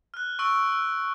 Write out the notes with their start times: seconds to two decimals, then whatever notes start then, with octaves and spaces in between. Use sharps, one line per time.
0.14 F6 F#6
0.39 C#6 E6 D7
0.72 E6